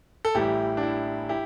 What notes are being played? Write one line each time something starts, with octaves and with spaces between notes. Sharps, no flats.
A4
A1 A2 E3 G3 E4 G4
D4
E4
E4 G4